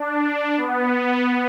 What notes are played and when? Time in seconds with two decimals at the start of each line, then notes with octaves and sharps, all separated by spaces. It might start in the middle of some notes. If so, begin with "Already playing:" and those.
Already playing: D4
0.57 B3